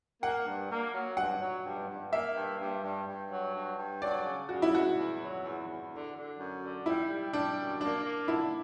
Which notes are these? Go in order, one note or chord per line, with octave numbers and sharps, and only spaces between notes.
A#3 F#5
G2
A#3
F#3
G2 F#5
F#3
G2
G2
A#3 E5
G2
G2
G2
G2
F#3
G2
G2
F#3 D5
C#3
C#3 F#4
E4
E2 F#4
E2
F#3
E2
E2
D3
D3
F#2
D3
G3 E4
G3
G3 D4
F#2
A#3 D4
A#3
D3 E4